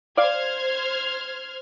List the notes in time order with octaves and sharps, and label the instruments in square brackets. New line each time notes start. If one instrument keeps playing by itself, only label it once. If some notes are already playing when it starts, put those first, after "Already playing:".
[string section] C5 F6 G#6 [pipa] D5 F5